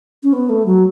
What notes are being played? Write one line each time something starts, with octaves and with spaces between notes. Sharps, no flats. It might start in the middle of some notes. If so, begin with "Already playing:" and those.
C#4
B3
A3
F#3